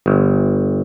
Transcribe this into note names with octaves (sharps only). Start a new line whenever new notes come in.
G1